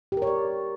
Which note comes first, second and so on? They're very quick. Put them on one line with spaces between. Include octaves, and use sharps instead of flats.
G4 A#4 C#5 D5